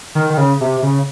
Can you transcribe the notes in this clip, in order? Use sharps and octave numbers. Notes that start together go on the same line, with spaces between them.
D#3
D#3
C#3
C3
C#3